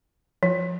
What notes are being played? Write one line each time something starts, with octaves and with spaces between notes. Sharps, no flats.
F3